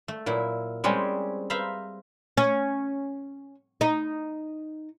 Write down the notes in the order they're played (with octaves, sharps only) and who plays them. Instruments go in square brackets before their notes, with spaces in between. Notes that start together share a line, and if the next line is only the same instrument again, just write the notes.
[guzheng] A3
A#2 F#3 E4
G3 G#3 C4 C#4 G4 G#4
C5 E5 F5 A#5 B5
[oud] C#4
D#4